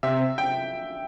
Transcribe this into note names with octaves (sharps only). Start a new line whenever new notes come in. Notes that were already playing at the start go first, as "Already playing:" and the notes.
C3 E5
G5